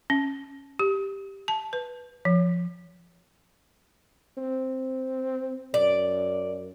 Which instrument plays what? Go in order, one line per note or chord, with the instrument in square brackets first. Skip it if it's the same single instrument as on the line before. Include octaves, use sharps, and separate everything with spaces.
[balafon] C#4
G4
A5
B4
F3
[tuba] C4
[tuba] F#2 [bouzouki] D5